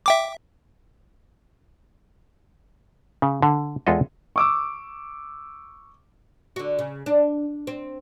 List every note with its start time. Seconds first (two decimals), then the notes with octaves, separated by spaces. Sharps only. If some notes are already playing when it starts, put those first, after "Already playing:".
0.06 E5 G5 D6
3.22 C#3
3.42 D3
3.87 E2 G#3 F4 A4 B4 D#5
4.36 C#6 D6 E6
6.56 D3 F#4
6.79 C#3
7.06 D4
7.67 C4